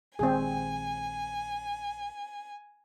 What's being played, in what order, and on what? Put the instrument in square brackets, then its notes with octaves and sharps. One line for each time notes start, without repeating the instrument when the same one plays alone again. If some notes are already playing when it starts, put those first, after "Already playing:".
[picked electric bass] A#1 D#3 G#3 [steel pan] C4 G#4 [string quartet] G#5